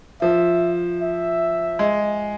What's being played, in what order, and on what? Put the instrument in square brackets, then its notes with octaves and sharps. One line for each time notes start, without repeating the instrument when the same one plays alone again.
[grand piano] F3 [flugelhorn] E5
[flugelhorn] E5
[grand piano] G#3